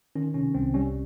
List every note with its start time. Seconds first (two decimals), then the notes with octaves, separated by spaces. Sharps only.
0.15 D#3 C#4
0.34 C3 C#4
0.54 C2 C4
0.74 G3 C#4